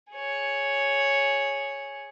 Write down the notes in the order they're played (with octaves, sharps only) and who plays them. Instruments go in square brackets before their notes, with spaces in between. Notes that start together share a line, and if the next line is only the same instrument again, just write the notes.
[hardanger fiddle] G#4 C#5